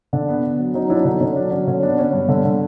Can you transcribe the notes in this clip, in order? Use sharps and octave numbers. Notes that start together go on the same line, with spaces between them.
D3 D4
B3
B3
F#3
F#3 C#4 D#4
F#3 D4 E4
D4
D3 C#4 D#4
D3 C#4
F#3 D4
F#3 C#4
D3 C#4
B3 D4
B3 C#4
G2
D3
D3